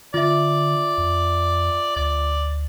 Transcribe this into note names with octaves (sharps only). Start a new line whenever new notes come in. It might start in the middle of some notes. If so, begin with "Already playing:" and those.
D3 F4 D5 E5
F2
D2 D5